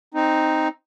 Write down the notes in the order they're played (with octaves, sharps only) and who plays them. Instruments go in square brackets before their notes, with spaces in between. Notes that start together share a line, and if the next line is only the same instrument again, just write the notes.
[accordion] C4 D#4